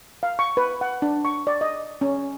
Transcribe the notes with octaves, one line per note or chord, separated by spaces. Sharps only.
F5
C#6
B4
F#5
D4
C#6
D5
D#5
C#4